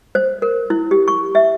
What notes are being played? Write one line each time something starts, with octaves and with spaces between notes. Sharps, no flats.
C5
A#4
E4
G4
C#6
E5